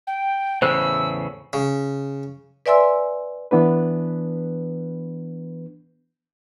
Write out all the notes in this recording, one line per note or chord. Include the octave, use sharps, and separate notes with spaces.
G5
E2 A2 C#3 C5 E6
C#3
B4 D5 E5 G#5 C6 E6
E3 B3 D4 B4